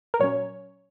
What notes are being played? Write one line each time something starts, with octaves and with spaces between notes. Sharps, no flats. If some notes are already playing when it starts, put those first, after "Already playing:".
A#4
A#2 F#3 C#4 C#5